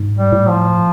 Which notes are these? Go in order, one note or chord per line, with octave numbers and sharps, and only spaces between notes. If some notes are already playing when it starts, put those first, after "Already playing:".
Already playing: G#2
G3
A2
F3